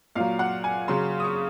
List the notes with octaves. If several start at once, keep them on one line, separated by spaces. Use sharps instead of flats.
A#2 F#3 F5
F#5
G#5
C#3 F#3 C6
D#6
C#6